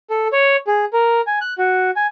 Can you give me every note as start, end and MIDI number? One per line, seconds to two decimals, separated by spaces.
0.10 0.28 69
0.32 0.56 73
0.67 0.85 68
0.93 1.21 70
1.27 1.39 80
1.41 1.54 90
1.58 1.91 66
1.96 2.07 80